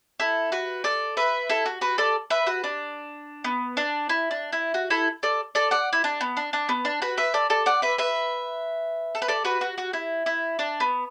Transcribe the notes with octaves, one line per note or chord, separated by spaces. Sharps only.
E4 A4
F#4 B4
A4 D5
B4 E5
E4 A4
F#4
F#4 B4
A4 D5
B4 E5
F#4 B4
D4
B3
D4
E4
D4
E4
F#4
E4 A4
A4 D5
A4 D5
D5 F#5
E4
D4
B3
D4
D4
B3
D4
F#4 B4
B4 E5
A4 D5
A4 D5
D5 F#5
B4 E5
B4 E5
A4
B4
A4 D5
F#4 B4
F#4
F#4
E4
E4
D4
B3